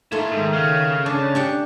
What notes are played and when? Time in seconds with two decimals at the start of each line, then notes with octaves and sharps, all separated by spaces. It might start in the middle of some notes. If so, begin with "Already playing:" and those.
0.12 A3 A#3 E4 C6
0.32 G#2 D#3
0.53 C#3 F5
1.06 C#4 D4 A5
1.35 D4 G4 F#5